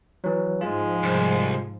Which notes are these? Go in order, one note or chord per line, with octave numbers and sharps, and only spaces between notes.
E3 F#3
G#2 F3 G#3 F4
C2